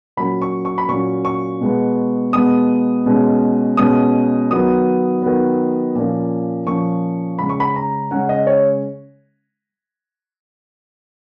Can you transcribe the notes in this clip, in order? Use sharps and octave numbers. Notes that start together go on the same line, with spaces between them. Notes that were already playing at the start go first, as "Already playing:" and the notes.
A#2 F#3 A#3 C#4 B5
C#6
C#6
B5
A#2 F#3 A#3 C#4 C#6
C#6
B2 G#3 B3
B2 G#3 B3 D#6
B2 G#3 C#4
B2 G#3 C#4 D#6
D#3 F#3 B3 D#6
D#3 F#3 B3
A#2 F3 A#3 C#4
A#2 F3 A#3 C#4 C#6
C#3 G#3 C#4 B5
C#6
B5
A#5
C#3 G#3 C#4 F#5
D#5
C#5